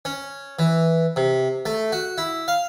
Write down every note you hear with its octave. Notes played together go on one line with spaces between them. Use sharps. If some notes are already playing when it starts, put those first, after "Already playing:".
C#4
E3
C3
A3
F#4
E4
F5